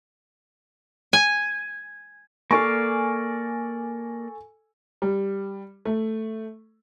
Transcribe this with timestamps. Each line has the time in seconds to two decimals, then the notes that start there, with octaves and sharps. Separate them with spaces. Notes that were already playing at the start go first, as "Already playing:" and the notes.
1.13 G#5
2.51 A#3 A4 D5 F5 G#5 C#6
5.02 G3
5.85 A3